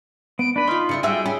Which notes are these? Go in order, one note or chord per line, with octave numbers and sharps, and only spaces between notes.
B3 D7
D4 B4 B5
D#4 F4 C6 F6
C#3 D4 E4 C#7
G3 F#4 G#4 E5 G5
C#4 G#4 B5